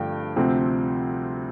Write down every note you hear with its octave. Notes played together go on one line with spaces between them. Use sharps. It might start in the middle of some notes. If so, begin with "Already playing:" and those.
Already playing: G2 D3 F3 A3 F5 G5
D2 C3 F3 C4